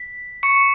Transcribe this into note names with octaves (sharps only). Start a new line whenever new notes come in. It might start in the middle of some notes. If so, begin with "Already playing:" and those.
Already playing: B6
C#6 C#7